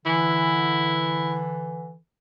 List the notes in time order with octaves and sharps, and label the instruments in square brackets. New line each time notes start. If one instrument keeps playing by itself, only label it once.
[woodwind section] D3 E3 [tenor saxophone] E4